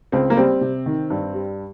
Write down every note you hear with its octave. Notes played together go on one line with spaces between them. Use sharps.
C#2 C4
A#3
G3 C4
C3
D#3
G2
G3